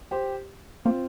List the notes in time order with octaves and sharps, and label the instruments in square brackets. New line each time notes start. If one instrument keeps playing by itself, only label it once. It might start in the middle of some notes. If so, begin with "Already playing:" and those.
[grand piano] G4 C5
[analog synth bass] A#3 [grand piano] C4 F4